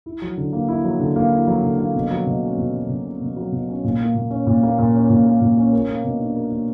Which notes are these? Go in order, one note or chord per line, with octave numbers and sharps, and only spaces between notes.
E4
F#3
D3
A#3
E4
F#3
D3
A#3
E4
F#3
D3
A#3
B2
F#3
B2
C#4
B2
F#3
B2
C#4
B2
F#3
B2
C#4
A#2
A#3
A#2
C#4
A#2
A#3
A#2
C#4
A#2
A#3
A#2
C#4
A#4
A#3
B2
D4
A#4
A#3